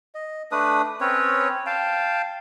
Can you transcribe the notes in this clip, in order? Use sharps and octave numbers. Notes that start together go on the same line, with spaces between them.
D#5
A3 D4 B4 D#6
C4 C#4 B4 C#5
F5 G5 A5